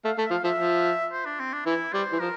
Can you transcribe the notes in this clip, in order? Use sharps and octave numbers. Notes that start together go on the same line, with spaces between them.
A3 F5
A3 E5
F3 F5
F3 E5
F3
C5
D4
C4
D4
E3 E4
G3 C5
E3
F3 A#4